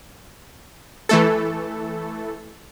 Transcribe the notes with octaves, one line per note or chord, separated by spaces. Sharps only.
E3 A3 A4